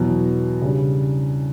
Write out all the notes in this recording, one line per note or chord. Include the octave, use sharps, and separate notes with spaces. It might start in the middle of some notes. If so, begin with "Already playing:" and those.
Already playing: E2 B2 F#3
C#3 G3 D4